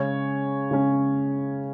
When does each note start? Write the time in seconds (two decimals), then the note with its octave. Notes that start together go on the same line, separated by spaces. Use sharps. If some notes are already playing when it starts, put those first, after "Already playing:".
Already playing: C#3 G#3 C#4 C#5
0.71 C#3 G#3 C#4